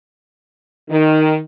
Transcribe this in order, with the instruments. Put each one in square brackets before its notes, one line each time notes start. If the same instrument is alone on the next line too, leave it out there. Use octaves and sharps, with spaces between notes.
[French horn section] D#3